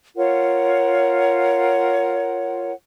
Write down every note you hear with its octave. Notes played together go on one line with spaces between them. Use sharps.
F4 A#4 C#5 F#5